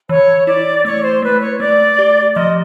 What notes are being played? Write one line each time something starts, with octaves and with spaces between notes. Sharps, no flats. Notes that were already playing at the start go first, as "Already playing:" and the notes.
E3 C#5
E4 D5
A3 C#5
C5
A3 B4
C#5
A3 D5
G4
F3 D#5